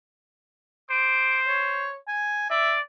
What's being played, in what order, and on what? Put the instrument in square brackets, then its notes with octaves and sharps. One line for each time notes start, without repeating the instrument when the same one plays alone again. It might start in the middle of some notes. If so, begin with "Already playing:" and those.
[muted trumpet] C5 [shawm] D6
[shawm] C#5
G#5
[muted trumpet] D5 [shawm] E5